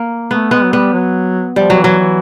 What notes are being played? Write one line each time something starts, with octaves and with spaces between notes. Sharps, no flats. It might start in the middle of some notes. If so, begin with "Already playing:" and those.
Already playing: A#3
A3 B3
G#3 B3
F#3
G3 B3
F#3
F3 G3
F#3
E3
F#3
E3